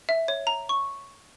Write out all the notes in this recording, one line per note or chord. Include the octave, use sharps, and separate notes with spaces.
E5
C#5
A#5
C#6